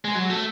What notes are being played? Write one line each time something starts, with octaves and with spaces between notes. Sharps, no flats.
G#3
F#3
A3